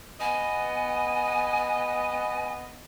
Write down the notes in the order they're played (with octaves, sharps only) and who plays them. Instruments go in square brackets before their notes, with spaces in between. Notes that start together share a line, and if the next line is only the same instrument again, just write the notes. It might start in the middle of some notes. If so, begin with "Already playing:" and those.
[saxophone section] B3 D#5 [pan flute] G#5